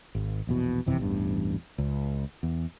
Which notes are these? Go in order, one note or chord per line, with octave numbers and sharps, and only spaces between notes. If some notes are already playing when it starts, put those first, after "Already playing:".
G#1
A#1 E2 B2
G1 F2 C3 E3
A1 E2 G2
C#2
E2